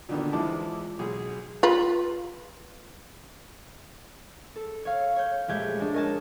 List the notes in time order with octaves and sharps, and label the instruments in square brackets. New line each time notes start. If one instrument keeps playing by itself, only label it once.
[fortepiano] D2 A#2 D3 D#3 B3
E2 F3 G#3 E4 A5 D6
B1 G#4
[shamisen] F4 B4
[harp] A4
C#5 F5
C#5 G6
A#1 G#3 A3 G4 G6 G#6
G#3 D4
A#4 C#5 D#5 G#5 A5